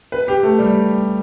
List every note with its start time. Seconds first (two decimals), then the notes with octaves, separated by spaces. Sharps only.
0.12 B4
0.28 G4
0.43 A3
0.59 G3